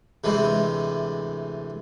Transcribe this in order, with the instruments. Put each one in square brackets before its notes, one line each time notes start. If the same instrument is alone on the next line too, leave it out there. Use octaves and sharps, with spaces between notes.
[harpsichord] D2 C3 E3 G#3